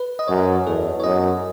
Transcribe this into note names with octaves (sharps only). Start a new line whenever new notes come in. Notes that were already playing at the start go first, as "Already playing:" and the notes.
Already playing: B4
D#5
F#2 C#5
E2 A4
C#5
F#2 D#5